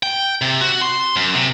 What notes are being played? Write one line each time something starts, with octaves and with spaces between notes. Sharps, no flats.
G5
C3
F#4
C6
F#2
C3